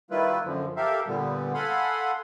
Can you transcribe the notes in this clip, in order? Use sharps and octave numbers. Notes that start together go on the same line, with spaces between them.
D#3 G3 A#3 E4 F4 B4
F#2 D3 F3
G4 A4 A#4 E5 F5
A#2 D3 G3 B3
A4 F5 F#5 G#5 B5 C6